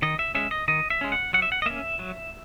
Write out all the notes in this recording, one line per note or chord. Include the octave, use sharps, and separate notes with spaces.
D#3 D#5
E5
G#3 C#4 E5
D#5
D#3 D#5
E5
G#3 C#4
F#5
F#3 F#5
E5
F#5
D#5
A#3 C#4 E5
F#3